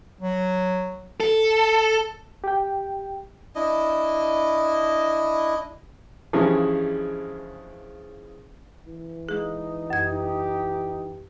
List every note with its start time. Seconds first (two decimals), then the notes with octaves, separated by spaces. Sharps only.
0.21 F#3
1.20 A4
2.44 G4 G5
3.55 D4 E4 D#5
6.33 G2 C#3 E3 F3 G#3
8.86 E3
9.29 G#3 D#4 G#4
9.90 F#2 G4 G#6